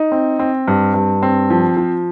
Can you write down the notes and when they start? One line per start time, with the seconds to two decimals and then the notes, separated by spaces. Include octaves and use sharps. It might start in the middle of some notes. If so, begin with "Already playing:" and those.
Already playing: D#4
0.12 C4
0.39 C4
0.67 G2
0.94 G2
1.23 C4
1.50 F3
1.77 F3